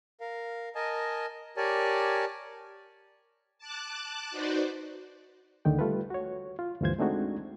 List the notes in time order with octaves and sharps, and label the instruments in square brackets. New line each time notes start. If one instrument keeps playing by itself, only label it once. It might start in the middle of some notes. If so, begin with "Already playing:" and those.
[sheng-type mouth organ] A#4 F5
A#4 D#5 G#5 A5
G4 A#4 C#5 D5 G#5 A5
[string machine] A5 D6 F#6
D#4 F#4 B4 C5 D5
[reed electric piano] D2 D3 D#3 G5
G3 A3 F4 A4 B4
F#4 C#5
F4
D2 G2 E3 F4 C5 G#6
G#3 A3 C4 D4 D#4 F#4